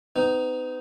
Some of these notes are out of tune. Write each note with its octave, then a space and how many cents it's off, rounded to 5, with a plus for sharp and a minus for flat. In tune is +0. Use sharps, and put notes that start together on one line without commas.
B3 +45 D#4 +0